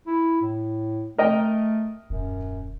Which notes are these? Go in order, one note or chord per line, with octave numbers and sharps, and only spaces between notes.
E4
A2
A3 A#4 D#5 G5
D#1 F#2